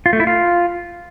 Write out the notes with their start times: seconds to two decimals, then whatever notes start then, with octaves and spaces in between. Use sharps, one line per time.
0.06 F4
0.13 A3
0.20 E4
0.27 F4